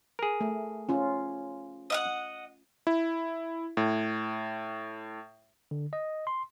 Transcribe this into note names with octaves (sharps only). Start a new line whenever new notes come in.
G#4 A#4
A3
C#4 F4
D#5 F5 F#5
E4
A2
D3
D#5
C6